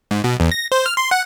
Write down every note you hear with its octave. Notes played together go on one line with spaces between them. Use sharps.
G#2
B2
E2
A#6
C5
F6
C6
F#5